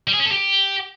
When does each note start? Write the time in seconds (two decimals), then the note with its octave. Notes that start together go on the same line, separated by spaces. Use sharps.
0.08 G3
0.13 G#4
0.19 C#4
0.25 A4
0.31 G4